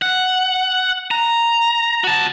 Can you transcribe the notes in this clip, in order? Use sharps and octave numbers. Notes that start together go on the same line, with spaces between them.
F#5
A#5
F#4 A5